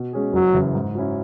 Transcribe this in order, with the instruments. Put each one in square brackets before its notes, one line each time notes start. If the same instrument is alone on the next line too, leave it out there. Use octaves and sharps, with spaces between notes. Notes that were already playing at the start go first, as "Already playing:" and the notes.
Already playing: [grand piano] B2
G#3 C#4 G#4
[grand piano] F#1 [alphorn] F#3
[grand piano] F#2 C#3 E3
G#2
F#3 C#4 E4